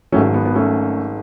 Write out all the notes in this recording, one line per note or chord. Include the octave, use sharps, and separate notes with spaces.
G#1 G#2 F#3 A3 C#4
B3
B3
A3 C#4